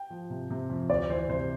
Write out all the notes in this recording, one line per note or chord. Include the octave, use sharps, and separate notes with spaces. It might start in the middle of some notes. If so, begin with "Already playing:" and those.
Already playing: G5
F3
C3
C3
F2
D2 D5
E3 C5
C3 C5